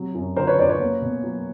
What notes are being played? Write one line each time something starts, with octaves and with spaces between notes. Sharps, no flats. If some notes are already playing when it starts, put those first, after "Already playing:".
Already playing: C3 F#3
F#2
D3 A#4 C5
B4 C#5
F#2 C5 D5
B4 C#5
A#3
B2
F#3